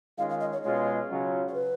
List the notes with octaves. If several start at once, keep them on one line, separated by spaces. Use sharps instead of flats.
D#3 G#3 C#4 F4 F5
F5
D#5
C#5
B2 G#3 C#4 F4 C#5
C#3 F#3 C#4 F4
C#5
B4